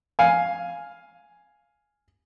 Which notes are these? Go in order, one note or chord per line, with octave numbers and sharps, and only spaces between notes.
F5 G#5